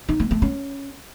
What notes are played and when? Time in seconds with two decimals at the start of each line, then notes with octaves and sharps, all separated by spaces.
0.09 D#4
0.20 A3
0.31 A3
0.42 C#4